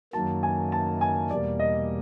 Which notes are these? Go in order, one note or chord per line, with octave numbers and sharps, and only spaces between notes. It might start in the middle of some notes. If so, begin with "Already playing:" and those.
F#2 D#3 F#3 A#3 A5
G#5
A5
G#5
E2 B2 G3 A#3 D5
D#5